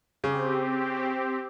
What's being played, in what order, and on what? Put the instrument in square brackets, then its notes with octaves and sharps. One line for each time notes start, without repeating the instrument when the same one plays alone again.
[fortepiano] C#3 [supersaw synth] C4 G4